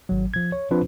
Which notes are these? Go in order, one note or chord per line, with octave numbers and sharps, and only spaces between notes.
G#1 F#3
F3 G#6
C#5
F3 C4 D4 F4 B4 C5